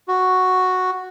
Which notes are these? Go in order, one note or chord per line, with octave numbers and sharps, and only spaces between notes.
F#4